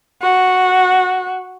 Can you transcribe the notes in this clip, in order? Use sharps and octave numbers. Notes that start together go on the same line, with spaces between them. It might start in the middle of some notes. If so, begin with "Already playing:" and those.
F#4